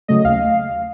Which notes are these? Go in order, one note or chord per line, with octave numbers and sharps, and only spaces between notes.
C#3 F#3 A3 D#5
D#2 F5